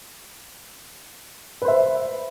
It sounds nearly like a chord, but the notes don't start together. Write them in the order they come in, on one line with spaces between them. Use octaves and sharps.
B4 C5 E5